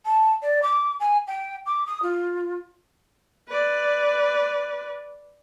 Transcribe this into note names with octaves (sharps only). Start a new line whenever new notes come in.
A5
D5
D6
G#5
G5
D6
D#6
F4
B4 D5